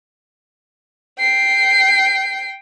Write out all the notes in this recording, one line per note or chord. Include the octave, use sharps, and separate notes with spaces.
G5 C7